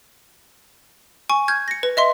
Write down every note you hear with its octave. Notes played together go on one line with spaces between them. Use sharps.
G#5 C#6
F6 G6 G#6
A#6 C#7
B4
D#5 E5 C6